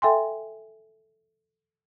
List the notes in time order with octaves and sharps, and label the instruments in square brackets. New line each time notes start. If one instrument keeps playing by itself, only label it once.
[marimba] A4 E5 G5 G#5 C6